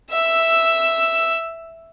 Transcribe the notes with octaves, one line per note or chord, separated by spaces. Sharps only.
E5 E6